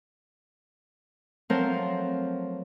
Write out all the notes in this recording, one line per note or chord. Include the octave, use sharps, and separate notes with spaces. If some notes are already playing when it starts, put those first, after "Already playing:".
F3 F#3 A3 C4 A#4 C5